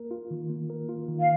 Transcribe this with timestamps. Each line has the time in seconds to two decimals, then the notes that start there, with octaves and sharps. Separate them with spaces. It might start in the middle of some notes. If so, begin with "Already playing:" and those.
Already playing: A#3 A#4
0.11 F4
0.31 D#3
0.49 A#3
0.70 A#4
0.89 F4
1.08 D#3
1.19 F5